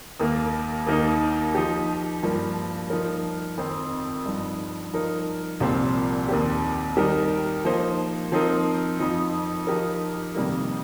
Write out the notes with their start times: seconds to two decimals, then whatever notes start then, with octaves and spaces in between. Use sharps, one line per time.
0.20 D#2 D#3 A#3
0.87 D#2 D#3 A#3 D#4
1.55 F3 D#4 G4
2.23 G2 F3 A#3
2.90 F3 D#4 A#4
3.58 F2 D#3 C4
4.26 G2 F3 D#4
4.94 F3 D#4 A#4
5.60 C2 A#2 F3 C4 G4
6.28 D#2 D#3 C4 G4
6.97 D#3 G3 D#4 G4 A#4
7.65 F3 A#3 D#4 C5
8.32 F3 C4 D#4 A#4
8.99 F2 F3 D#4
9.67 F3 D#4 G4 A#4
10.35 F2 C3 D#3 G3 A#3